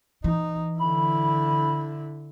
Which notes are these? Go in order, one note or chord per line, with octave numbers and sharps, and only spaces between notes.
E3 D#4
D3 E4 B5